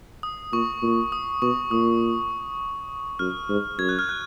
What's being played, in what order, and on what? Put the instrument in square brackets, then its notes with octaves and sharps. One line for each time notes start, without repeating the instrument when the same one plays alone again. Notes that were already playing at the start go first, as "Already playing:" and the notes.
[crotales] D#6
[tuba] A#2 [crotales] C#6
[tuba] A#2
[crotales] D#6
[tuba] B2 [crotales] C#6
[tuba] A#2 [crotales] D#6
[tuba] F#2 [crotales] F6
[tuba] G#2
[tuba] F#2 [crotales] G#6
[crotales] F#6
F6
F#6